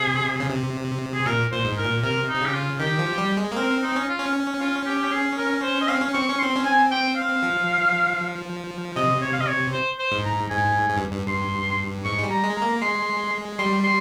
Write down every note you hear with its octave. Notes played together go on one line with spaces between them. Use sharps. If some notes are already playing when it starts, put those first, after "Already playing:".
Already playing: C3 G#4
C#3
C3
G#4
A#2 A#4
A#2 C5
G#2
A#4
A#2
C3 A#4
C3 D#4
C#3 G4
F4
D#3 G4
F3
G3
G#3
A#3
C4 A#4
D#4
C#4
F4
C#4
F4
G4
G4
G#4
A#4
C5
D#5
C4 F5
C#4
C4 C#6
C#4 C#6
C4 C6
C#4
C4 G#5
G5
F5
F3
C3 D#5
C#5
F5
D#5
C#5
C5
C5
G#2
A#5
G#2 G#5
G#2
G2
G2
G2 C6
G#2 C#6
G#3
G3
A#5
G#3
A#5
A#3
G#3 C6
G3 C6
C6